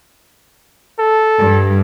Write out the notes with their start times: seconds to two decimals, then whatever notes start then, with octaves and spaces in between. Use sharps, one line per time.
0.99 A4
1.39 G2